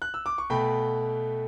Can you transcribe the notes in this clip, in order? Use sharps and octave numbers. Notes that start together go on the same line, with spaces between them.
F#6
E6
D6
C#6
B2 A3 G5 B5